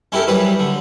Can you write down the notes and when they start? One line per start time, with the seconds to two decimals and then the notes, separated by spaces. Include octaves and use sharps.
0.12 C#4 E4 G4 A4 A#4
0.27 E3 F#3 G3 B4 C#5
0.60 D3